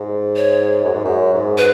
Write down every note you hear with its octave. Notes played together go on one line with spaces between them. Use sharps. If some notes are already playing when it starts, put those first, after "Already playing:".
Already playing: G#2
C#5
F#2
G#2
F#2
G#2
B4